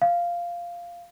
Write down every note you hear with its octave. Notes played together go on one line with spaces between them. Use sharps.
F5